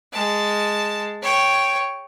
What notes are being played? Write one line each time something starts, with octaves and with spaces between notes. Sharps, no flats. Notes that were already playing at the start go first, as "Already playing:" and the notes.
G#3 A5
C#5 G5